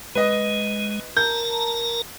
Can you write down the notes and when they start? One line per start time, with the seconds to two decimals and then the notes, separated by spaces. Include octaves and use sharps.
0.15 G#3 B4 D#5
1.17 A#4 A5 A#5 G6